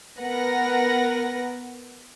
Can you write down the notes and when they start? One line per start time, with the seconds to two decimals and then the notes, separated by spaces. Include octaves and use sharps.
0.20 B3 A#4 B4 F#5 A#6